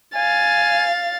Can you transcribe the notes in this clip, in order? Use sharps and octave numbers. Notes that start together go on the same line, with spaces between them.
F5 G#5 A6